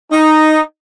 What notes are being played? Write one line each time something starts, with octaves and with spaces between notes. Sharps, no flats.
D#4